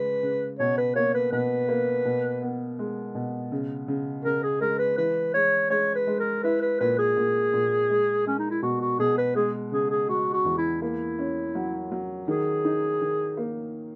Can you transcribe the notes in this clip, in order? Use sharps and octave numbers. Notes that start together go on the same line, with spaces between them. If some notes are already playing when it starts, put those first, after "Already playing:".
Already playing: C#3 G#3 B4
C#3
B2 C#5
B4
A#3 C#5
B4
B2 B4
A#3
B2
B3
G#3
B2
C#3
C#3
C#3 A#4
G#4
G#3 A#4
B4
E3 B4
G#3 C#5
G#3 C#5
B4
G#3
A#4
E4 B4
B4
A#2 B4
G#4
A#2
A#2
G#3
G#3 C#4
D#4
E4
B2 F#4
F#4
B2 G#4
B4
G#3 G#4
C#3 G#4
G#4
G#3 F#4
F#4
E2
E4
A#3 E4
C#4
F#3
F#3
D#3 G#4
D#4
D#3
A#3